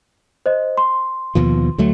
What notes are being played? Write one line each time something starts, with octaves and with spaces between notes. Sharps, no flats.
C5 D#5
C6
D#2 B2 F3
D2 F#3 A3